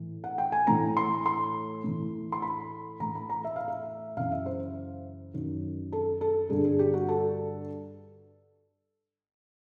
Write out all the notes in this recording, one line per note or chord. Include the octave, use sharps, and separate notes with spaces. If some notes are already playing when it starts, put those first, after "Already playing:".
Already playing: A2 E3
F#5
G5
G#5
A2 E3 A#5
C6
C6
A2 E3
C6
B5
A2 E3 A#5
B5
A#5
E5
F5
E5
F#2 C#3 E3 F5
E5
C5
F#2 D#3
A4
A4
G2 D3 G#4
G#4
G4
F#4
A4